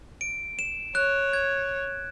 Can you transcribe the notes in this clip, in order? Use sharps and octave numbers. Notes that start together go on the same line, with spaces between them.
D7
E7
C#5 F#6
G#6